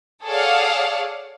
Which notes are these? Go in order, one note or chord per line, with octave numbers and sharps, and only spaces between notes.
G#4 A4 C#5 D5 F5 F#5